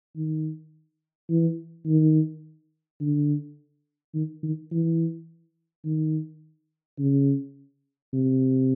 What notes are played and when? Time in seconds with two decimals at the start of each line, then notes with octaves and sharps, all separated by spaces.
0.16 D#3
1.30 E3
1.87 D#3
3.00 D3
4.15 D#3
4.43 D#3
4.71 E3
5.85 D#3
6.99 C#3
8.13 C3